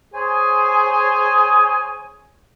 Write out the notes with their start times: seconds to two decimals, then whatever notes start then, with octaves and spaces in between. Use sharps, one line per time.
0.14 G#4 C5 C#5 G#5